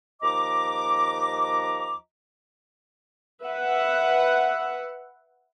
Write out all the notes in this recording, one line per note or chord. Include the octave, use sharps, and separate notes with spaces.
D#2 F3 D#5 A#5 D6
B4 E5 F#5